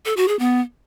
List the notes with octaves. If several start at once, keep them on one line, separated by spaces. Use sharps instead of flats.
A4
F#4
G#4
B3